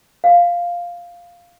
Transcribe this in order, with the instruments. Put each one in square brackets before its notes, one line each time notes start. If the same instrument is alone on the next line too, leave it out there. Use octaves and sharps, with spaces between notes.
[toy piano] F5